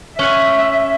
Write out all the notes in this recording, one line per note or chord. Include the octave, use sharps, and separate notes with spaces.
C#4 E5 F#5 G#5